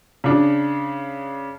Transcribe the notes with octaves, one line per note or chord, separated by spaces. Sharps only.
C#3 D4